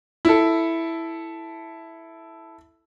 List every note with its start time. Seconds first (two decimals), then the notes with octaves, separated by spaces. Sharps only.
0.25 E4 A4